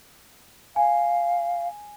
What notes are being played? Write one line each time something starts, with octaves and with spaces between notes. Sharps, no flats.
F5 G#5